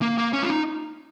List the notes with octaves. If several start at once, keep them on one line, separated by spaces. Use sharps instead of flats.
A#3
A#3
C#4
F4
D#4